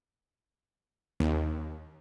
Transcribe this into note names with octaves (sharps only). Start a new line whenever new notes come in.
D#2